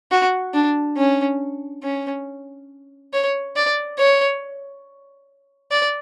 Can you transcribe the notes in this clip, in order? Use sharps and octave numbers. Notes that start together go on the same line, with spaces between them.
F#4
D4
C#4
C#4
C#5
D5
C#5
D5